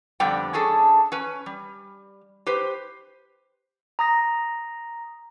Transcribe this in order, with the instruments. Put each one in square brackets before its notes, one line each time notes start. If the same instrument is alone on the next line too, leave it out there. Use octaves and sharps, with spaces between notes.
[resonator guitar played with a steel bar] F2 D3 G3 B3 D5 G5
C#4 D4 G#4 A4
C#4 B4
G3
G4 B4 C5
[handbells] A#5 D#6 A#6